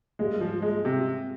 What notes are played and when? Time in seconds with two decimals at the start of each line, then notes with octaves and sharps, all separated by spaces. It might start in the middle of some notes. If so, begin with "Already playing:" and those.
0.19 G#2 G3 G#3 A#3 F4
0.41 F3
0.62 G#3
0.85 C3